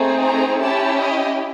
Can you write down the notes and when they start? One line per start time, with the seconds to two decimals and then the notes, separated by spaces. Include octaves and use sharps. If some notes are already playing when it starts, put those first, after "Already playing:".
Already playing: A3 C4 D#4 G#4
0.22 A#5
0.60 C#4 E4 G4 A5
0.99 D#5